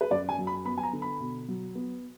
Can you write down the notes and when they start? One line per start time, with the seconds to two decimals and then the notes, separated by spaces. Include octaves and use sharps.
0.01 B4
0.10 F#2 D5
0.29 G#5
0.38 F#3
0.47 B5
0.65 B3 B5
0.78 G#5
0.83 A#5
0.93 D3
1.02 B5
1.20 B2
1.48 F#3
1.75 B3